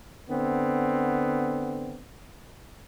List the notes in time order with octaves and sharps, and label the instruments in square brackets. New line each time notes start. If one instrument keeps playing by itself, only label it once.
[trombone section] D3 B3 C4